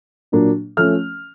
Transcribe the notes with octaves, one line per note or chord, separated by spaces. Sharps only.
A#2 F#3 A#3 D4
F3 A3 C#4 F6